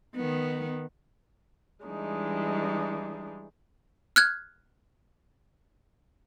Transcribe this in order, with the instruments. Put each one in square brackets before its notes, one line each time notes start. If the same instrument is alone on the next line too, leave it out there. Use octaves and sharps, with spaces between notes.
[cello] D#3 B3
[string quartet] E3 G3 G#3 D4 D#4
[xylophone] F6 F#6 G#6